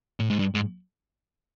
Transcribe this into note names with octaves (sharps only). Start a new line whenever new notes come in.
A2
G#2
G2
G#2